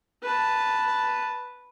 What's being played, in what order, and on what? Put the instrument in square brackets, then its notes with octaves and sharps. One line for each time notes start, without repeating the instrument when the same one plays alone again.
[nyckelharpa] B4 A5